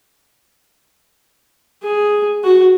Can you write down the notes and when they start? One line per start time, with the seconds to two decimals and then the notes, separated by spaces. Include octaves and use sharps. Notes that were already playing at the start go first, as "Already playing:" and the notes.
1.82 G#4
2.43 F#4